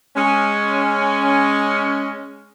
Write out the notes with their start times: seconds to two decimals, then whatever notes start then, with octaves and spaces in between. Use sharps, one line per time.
0.16 G#3 C#4